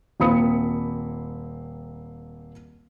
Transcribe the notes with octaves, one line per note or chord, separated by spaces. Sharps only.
D#1 A#3 C4 B5 D#6 C#7